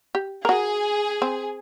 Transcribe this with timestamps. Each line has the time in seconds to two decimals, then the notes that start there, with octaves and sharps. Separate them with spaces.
0.15 G4
0.45 F#4 G#4 A#4
1.22 C4